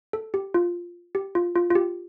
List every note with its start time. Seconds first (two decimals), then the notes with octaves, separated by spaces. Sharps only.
0.13 A4
0.34 G4
0.54 F4
1.15 G4
1.35 F4
1.56 F4
1.70 F4
1.75 G4